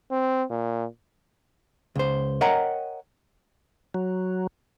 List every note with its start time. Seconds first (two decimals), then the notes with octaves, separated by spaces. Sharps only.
0.11 C4
0.50 A#2
1.96 C#2 C5
2.41 A#4 C#5 D#5 F#5 G5 A#5
3.94 F#3